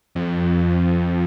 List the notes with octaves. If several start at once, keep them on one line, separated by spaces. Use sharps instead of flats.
F2